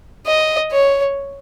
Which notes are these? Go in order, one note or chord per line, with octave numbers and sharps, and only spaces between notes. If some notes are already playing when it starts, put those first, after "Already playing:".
D#5
C#5